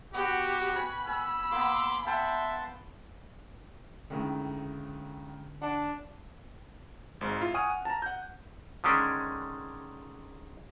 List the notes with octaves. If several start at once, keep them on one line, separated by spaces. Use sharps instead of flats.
B3 F#4 G4
G5 G#5 B5 C#6 F#6
G#5 E6
A#3 B3 C6 D6
E5 F#5 G5 A5 C6
C#2 A2 D3 D#3
D4 F#5
G#1 G#2
E4 F4
F#5 G#5 C#6 D#6 F6 D#7
F#5
A5 A#5
F#5 G6
D3 D#3 G#3 C#4 D4